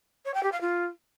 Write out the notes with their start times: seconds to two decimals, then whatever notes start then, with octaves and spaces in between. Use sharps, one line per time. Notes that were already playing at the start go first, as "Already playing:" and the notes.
0.25 C#5
0.34 G5
0.43 G4
0.52 F5
0.61 F4